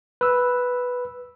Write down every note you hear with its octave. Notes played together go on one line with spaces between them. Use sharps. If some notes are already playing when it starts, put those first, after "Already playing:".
B4 E6